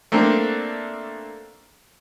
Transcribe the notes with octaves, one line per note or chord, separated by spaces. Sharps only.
A3 A#3 C4 D4